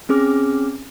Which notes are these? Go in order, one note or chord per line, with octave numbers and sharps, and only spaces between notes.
C4 C#4 G#4 D6 F6